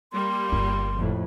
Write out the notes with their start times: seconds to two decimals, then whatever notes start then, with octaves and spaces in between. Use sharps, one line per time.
0.13 G3 A#3 C6
0.52 G1 F4
0.96 F2 A2